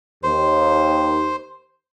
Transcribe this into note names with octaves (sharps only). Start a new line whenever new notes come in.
D#2 C5